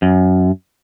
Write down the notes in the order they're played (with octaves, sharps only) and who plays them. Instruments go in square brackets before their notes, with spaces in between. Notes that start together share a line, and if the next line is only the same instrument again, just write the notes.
[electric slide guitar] F#2